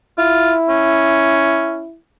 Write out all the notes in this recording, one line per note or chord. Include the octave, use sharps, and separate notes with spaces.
E4 F4
C#4